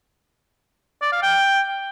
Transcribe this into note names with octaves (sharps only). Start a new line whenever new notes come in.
D5
F5
G5